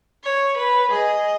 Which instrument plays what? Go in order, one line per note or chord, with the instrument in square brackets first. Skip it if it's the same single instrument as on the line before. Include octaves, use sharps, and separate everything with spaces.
[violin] C#5
B4
[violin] G#4 [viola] D#5